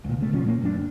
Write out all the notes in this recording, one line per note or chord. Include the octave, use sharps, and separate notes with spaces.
C#2 A#2
C#3 A3
D#1 B1 F3 C#4
A#2 A3 A#3
F#1 F#2 C#4 D4
F#1